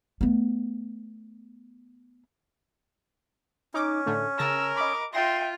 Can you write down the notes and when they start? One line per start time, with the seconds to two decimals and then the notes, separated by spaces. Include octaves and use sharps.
0.21 A3 B3
3.74 C#4 D#4 D6
4.06 A2 D3 A3
4.38 C#3 A#4 A5 E6 A#6
4.76 D#5 B5 D6
5.13 F4 E5 G5 C6 A#6